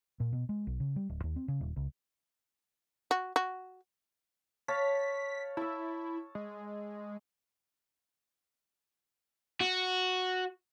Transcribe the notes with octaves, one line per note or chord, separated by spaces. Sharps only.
A#2
B2
G#3
B1
C#3
G3
D1
D#2
C4
C#3
D#1
C#2
F#4
F#4
C#5 F5 A5 B6
E4 A5 E6
G#3
F#4